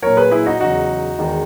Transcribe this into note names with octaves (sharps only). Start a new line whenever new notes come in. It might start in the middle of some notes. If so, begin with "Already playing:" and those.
A#2 F#3 A#4 C#5
G#4 B4
E4 G#4
D#4 F#4
E2 C#3 F#3 D#4 F#4
E2 D#3 G#3